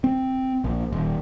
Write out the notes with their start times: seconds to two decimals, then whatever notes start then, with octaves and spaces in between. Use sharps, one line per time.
0.04 C4
0.64 A#1
0.92 D#1